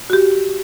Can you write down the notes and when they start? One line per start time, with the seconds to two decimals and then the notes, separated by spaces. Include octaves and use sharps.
0.10 F#4
0.13 G4